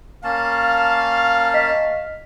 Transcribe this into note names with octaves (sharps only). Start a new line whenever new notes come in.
A#3 C#4 F5 A5
D#5 B6